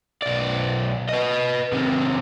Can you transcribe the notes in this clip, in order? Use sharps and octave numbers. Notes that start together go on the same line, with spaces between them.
B1 D5
B4 D#5
C3 D#3